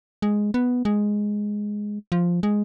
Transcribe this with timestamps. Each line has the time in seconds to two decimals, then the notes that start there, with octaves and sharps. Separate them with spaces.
0.22 G#3
0.54 B3
0.85 G#3
2.12 F3
2.43 G#3